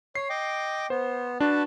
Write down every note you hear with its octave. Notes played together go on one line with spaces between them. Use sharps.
C#5 C7
D#5 G5 D6
B3 C5
D4 F#4 B4 A5